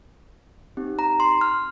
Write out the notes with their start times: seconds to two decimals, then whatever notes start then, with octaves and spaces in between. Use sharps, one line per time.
0.77 C4 D#4 G4
0.99 A#5
1.20 C6
1.41 F6